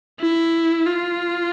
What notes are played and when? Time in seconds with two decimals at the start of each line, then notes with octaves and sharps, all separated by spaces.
0.20 E4
0.86 F4